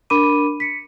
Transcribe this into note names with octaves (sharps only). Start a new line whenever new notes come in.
D4 A#4 B5 D6 D#7
B6 C#7